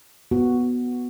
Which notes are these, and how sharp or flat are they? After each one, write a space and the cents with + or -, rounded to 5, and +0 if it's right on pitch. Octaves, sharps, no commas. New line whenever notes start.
B3 -5 F#4 +0